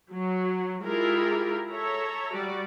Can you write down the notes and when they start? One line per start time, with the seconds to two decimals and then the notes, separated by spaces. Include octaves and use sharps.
0.10 F#3
0.85 G#3 E4 F4 G4 G#4 A#4
1.70 A4 C#5 E5 A#5
2.34 G3 F#4 D5